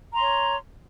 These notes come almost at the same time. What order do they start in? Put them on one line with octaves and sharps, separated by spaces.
A#5 C6 C#5